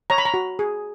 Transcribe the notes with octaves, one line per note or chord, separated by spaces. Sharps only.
C#5 A#5
B5
A#5
F#4
G#4